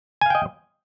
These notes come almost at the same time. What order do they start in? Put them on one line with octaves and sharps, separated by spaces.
G#5 F5 G5 D#5